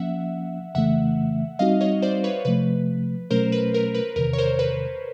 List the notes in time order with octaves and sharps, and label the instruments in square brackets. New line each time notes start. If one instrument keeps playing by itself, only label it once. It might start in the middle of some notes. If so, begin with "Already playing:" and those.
Already playing: [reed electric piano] F3 A#3 C#4 [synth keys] E5 F#5
[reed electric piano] F2 C#3 E3 A3 [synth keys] E5 F#5
[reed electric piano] G3 C4 D#4 F#4 [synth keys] D#5 F5
[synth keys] C#5 D#5
C5 D5
B4 C#5
[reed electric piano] C3 F3 A3 [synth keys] B4
[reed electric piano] B2 F#3 A3 C#4 [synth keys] A#4 C5
[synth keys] B4
A#4
B4
[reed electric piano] E2 C3 D#3 [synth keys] A#4
[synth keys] C#5
A#4 C5
B4